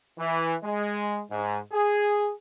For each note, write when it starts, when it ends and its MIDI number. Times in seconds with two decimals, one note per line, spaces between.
0.18 0.54 52
0.64 1.22 56
1.30 1.59 44
1.73 2.31 68